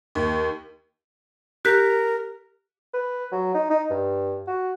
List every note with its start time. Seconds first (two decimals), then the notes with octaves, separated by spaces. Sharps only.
0.15 D#2
1.65 G4 A#4 F#6 B6
2.93 B4
3.32 F#3
3.54 D#4
3.70 D#4
3.90 G2
4.47 F#4